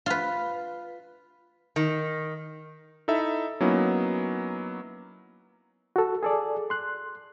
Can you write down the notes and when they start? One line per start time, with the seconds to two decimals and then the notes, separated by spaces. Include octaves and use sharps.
0.06 F4 B4
1.76 D#3
3.08 D#4 E4 A4 E5
3.61 F#3 A#3 B3 C#4 D#4 E4
5.96 F#4 A4
6.23 G#4 A4 D5
6.70 C6 F#6